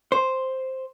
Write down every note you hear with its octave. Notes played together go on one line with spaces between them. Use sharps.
C5